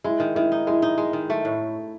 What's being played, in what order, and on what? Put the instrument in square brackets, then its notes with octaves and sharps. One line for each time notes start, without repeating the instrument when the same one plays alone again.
[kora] G#3 [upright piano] E4
[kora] D#3
[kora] D#3 [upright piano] E4
[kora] D#4
[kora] G#3 [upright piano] E4
[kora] D#4
G#3
D#3
A3
A2